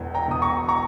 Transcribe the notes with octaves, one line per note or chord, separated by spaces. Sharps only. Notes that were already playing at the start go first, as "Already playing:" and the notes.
Already playing: E1 E2
G5 A#5
B2 D#6
A#5 C#6
A#5 C#6